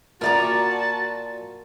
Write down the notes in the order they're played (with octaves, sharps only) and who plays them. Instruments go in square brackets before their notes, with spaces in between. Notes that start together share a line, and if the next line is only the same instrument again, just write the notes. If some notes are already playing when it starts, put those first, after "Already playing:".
[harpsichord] A#2 [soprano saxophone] F#4 [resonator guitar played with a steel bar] A#4 D5 A#5 [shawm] A5